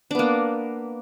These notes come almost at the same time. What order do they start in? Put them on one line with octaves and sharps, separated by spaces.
D4 B3 A#3